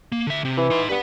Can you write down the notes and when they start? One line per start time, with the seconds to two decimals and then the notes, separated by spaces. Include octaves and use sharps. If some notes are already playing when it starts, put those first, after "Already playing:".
0.12 A#3
0.27 D3 E5
0.45 C3
0.57 E3
0.70 D#4 C6
0.89 G2 B4 F#5